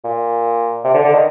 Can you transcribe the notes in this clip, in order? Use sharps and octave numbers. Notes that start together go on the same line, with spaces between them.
A#2
C3
D3
D3
D#3